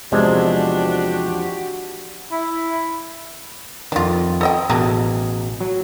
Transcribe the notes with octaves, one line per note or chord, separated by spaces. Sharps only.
E2 C3 F3 G#3 D4 F#4 G4
E4
F2 D#3 D4 F4
A4 D#5 G5
A1 B2 D3 G#4 A#4
F#3